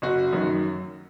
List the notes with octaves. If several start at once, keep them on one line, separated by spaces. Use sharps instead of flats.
F#1 F#4
F#2 D#3 F#3